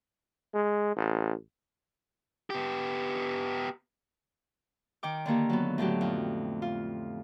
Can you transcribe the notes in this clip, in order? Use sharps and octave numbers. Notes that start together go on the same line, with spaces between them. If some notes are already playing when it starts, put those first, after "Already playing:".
G#3
A1
B3 G4
D#3 G5 D6
D3 D#3 A#3 G4
F#3 B3
A2 D3 F#3 G4
F2
F4